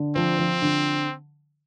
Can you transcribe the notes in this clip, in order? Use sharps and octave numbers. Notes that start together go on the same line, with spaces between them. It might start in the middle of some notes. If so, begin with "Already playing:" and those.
Already playing: D3
F3 C4
F3
D3